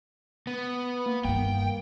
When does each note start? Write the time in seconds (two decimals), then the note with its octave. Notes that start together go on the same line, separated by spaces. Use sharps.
0.47 B3
1.06 A#3
1.25 G2 D#3 G5